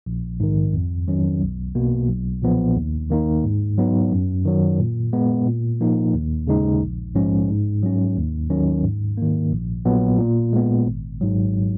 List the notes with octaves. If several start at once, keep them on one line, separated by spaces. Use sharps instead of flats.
A#1
G#2 D#3
F2
D#3 F#3 C#4
B1
B2 A#3
B1
A#2 F3 B3
D#2
D#3 A#3 D#4
G#2
F#3 B3 D#4
F#2
D#3 F#3
A#2
G#3 B3
A#2
F3 A#3 D#4
D#2
C#3 G#3 D#4
A#1
G#2 F3 G#3 C#4
G#2
F#3 C#4
D#2
D#3 F#3 C#4
G#2
D#3 A#3
A#1
A#2 F#3 B3
A#2
G#3 B3
G#1
G#2 F#3